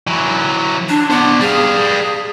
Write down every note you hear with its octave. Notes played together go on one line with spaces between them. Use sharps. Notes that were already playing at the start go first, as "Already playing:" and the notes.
E3 F#3
D4
B3 D4 C5
G3 G#4 F5